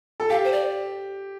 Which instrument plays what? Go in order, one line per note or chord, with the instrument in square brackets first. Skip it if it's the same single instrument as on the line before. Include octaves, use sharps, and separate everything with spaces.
[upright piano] A4
[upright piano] G4 [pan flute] F5
[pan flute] C5
D5